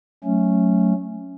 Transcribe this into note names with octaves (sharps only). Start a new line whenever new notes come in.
F#3 A3 C#4